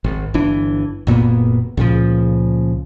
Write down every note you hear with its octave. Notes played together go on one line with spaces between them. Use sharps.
G#1
G1 E3 D4
F#1 A#2 A#3 B3
C#2 A#2 C#3 F3